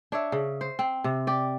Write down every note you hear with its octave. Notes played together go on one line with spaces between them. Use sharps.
D4 C#5 E5
C#3
C5
C4
C3
G4 D5